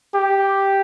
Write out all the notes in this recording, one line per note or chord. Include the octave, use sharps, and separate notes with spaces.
G4